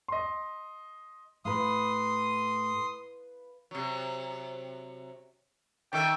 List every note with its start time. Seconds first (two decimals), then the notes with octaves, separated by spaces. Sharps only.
0.08 D#5 C6
1.45 A2 B4 F5 C6 D#6
3.71 C3 F#3
5.93 D#3 A4 E5 G5